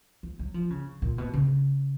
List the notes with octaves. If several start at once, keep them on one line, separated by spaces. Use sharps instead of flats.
F3
F#3
F3
C#3
A#2
B2
C#3